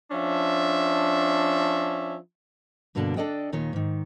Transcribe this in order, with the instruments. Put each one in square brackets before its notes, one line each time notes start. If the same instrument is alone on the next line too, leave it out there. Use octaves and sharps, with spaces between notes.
[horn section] F3 C#4 D4 E5
[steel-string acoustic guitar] G2 B2 D3 A#3 D4
D4 A4 D5 D#5 G5
D#2 A#2 D#3 C#5
G#2 D#3